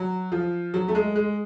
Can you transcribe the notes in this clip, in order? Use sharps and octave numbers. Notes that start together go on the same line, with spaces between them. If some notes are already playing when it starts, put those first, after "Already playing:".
Already playing: F#3
F3
F#3
A3
G#3
G#3